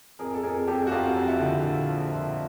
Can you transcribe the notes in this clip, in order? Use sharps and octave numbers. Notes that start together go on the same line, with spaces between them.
F2 G#4 A#4
A4
F2 G#4 A#4
F2 G4 A4
F#4
F2 F4 G4
F2
E4 F#4
D3
A#2
F3
A#2